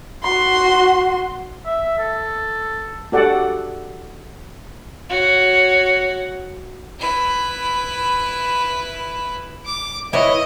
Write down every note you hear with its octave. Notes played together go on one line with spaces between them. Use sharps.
F#4 C6
E5
A4
F#4 G4 A4 D5 F#5
F#4 C#5
E4 B4
D6
E4 B4 C#5 D#5